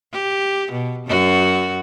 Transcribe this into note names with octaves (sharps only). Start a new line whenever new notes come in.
G4
B2
F#2 F#4